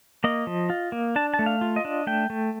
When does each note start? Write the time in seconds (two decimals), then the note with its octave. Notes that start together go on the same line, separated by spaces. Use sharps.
0.24 A#3 D#5
0.47 F3
0.70 F4
0.92 A#3
1.16 D4 A5
1.34 A5
1.39 A3
1.46 F5
1.61 F4
1.76 D#5
1.85 D4
2.07 A3 G5
2.30 A3